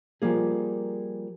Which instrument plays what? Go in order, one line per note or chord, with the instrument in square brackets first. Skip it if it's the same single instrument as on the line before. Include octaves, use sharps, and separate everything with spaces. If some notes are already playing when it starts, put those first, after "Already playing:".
[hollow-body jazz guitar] F3 G3 A#3 G#4